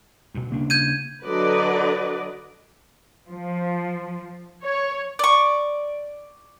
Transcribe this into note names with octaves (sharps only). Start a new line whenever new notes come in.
G2 B2
C#3 A#3 D4
G6 G#6 D#7
D3 F#3 B4 D5 D#5
F3
C#5
D5 C#6